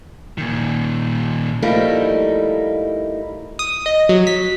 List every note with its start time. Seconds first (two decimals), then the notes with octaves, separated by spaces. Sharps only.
0.38 A#2 D#3
1.62 F3 G3 A3 A#3 D#4 E4
3.59 D#6
3.86 D#5
4.09 F#3
4.27 B6